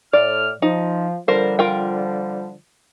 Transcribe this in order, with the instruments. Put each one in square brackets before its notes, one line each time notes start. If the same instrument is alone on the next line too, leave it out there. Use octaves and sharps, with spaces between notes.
[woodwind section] A2 F6 [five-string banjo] D5
[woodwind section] F3 [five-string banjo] D#4
[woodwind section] D3 F3 G3 [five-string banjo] A#4 C5
[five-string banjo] F4 A#4 G5